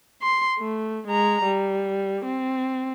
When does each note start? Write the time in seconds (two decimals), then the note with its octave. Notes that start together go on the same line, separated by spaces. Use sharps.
0.22 C6
0.58 A3
1.07 G#3 A#5
1.44 G3
2.26 C4